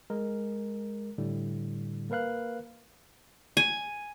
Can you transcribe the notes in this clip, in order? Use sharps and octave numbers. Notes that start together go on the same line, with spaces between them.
G#3 A#4
A2 D3 G3
A#3 A#4 B4 F5 F#6
G#5